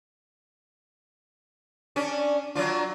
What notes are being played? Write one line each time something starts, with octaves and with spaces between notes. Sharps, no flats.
C#4 D4
F#3 D4 F4